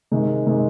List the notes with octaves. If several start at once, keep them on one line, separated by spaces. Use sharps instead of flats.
C3 D#3 G#3
C3 D#3 G#3